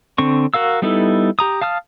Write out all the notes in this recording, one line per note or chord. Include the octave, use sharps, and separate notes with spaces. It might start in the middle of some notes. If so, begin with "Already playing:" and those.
D3 C4 C#6
F#4 A#4 F5 E6
G3 B3 D#4 E4 A4
G4 A#5 D#6
F5 A5 D#6 F6